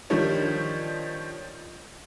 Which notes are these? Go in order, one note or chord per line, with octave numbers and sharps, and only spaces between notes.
D#3 F3 G3 D4 C#5